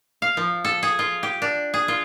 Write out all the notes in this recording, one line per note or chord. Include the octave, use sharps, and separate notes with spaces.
F5
F3
A4
G#4
F4
G4
D4
G#4
F4